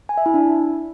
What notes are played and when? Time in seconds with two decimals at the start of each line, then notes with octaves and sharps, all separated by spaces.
0.09 G#5
0.18 E5
0.26 E4
0.34 D4